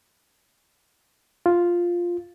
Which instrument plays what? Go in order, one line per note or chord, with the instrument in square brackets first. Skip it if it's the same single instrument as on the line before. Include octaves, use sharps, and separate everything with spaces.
[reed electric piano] F4